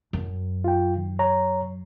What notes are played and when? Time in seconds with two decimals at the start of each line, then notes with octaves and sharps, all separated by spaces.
0.13 F#2
0.64 F4 G5
0.97 D#3
1.19 C#5 A#5